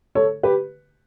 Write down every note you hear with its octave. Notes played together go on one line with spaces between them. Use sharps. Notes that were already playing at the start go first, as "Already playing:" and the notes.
A4 C#5
G4 B4